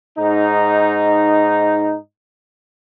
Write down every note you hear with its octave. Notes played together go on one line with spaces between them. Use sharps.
G#2 D#4